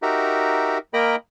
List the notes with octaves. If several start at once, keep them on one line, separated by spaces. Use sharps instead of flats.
D#4 F#4 G4 A#4 E5
A#3 A#4 D#5 G5 B5